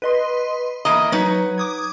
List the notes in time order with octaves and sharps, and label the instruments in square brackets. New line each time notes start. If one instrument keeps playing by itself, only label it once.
[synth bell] B4 D#5 C6
[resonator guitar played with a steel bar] E2 A#3 D#5 [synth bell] A#5 B5
[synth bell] F#3 [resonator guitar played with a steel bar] D#4 B4 C#5
[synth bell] D6 D#6 G#6